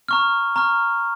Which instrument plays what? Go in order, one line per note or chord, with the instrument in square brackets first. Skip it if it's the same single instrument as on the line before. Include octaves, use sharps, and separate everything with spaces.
[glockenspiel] A#5 C#6 F6
A#5 C#6 F6